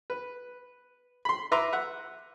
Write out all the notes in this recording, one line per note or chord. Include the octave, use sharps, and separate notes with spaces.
B4
B5 C6
E4 B4 E5 A#5 C6 D6
E5 F#5